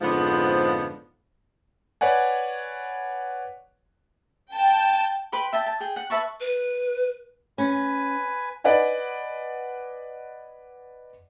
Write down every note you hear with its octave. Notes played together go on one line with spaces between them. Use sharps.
F2 G#2 D3 F3 B3
B4 C#5 D5 F#5 G#5
G5 A5
B4 G5 B5 C6
E5 G5 A5
A5
G#4 G5
F#5
B4 E5 A5 C#6
B4
C#4 B4 G#5
B4 D5 D#5 F#5 G#5